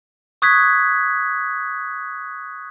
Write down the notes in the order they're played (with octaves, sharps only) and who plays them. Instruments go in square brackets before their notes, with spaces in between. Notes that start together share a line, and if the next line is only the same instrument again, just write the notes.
[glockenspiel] C#6 D#6 F#6 G#6 B6